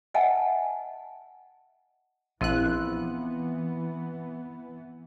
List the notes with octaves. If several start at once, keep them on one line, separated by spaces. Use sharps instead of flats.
D#5 E5 F#5 G#5 A5
A#1 E3 F3 B3 C4 E4 F#6